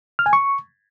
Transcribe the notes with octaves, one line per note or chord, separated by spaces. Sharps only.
F6
G#5
C#6